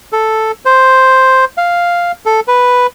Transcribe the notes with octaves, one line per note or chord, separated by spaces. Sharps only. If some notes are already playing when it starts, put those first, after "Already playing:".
A4
C5
F5
A4
B4